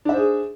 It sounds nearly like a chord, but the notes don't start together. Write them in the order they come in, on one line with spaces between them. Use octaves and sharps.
D4 E5 C5 G#4